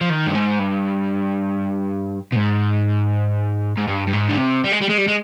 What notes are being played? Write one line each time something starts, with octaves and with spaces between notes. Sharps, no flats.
F3
D#3
G2
G#2
G2
B2
G#2
G#2
G2
G2
G#2
D3
C3
G3
G#3
G3
G#3
G3
G#3